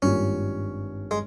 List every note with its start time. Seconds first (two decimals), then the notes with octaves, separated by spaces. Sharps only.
0.02 G#1 G2 G3 A#3 C#4 F4
1.11 G#3